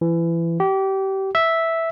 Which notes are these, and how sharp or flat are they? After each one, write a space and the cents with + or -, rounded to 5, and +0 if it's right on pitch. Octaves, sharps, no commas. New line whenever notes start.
E3 +25
G4 -25
E5 -5